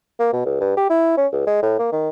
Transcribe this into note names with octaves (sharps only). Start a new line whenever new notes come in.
A#3
B2
C#2
G2
G4
E4
C#4
C#2
G#3
A2
A#3
D#3